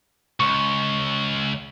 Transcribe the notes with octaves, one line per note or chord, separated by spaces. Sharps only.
C#2 C#6